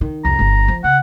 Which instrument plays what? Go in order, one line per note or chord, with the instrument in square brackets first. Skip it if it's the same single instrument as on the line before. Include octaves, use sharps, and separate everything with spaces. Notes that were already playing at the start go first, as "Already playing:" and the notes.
[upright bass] D#3
[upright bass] C2 F2 [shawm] A#5
[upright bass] G1 G2
F3
[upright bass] C#3 [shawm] F#5